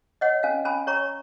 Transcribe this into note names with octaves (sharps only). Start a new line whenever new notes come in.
C#5 D#5 F#5
C#4 F5 G#5
C#4 G#5 B5
C#5 A#5 C#6